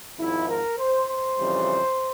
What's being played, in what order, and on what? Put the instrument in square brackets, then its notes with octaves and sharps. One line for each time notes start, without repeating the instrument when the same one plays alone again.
[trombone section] G#1 G#2 F3 E4
A#4
C5
C5
F2 C#3 E3 G3